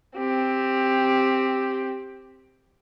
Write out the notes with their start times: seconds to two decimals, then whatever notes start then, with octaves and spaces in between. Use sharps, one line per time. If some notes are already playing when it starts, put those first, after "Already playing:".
0.16 C4 G4